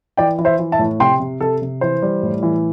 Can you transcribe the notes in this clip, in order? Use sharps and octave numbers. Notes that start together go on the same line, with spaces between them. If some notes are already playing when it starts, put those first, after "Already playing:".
E3 D5 G5
E3
C5 E5
E3
E5 A5
A2
C3 G5 C6
C3
C3 A4
C3
E3 C5
G3
A2
E3